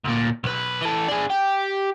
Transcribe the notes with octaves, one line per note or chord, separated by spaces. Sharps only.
D2 A#2
B1 B4
E3 A4
D4 G#4
G4